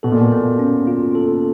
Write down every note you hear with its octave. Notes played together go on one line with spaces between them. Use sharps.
B2 A4
A#2
B2
A#3
C#4
F4
A4